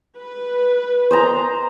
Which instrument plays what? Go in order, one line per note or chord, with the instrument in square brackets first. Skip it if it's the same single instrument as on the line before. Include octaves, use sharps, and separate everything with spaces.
[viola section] B4
[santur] C5 D#5 A#5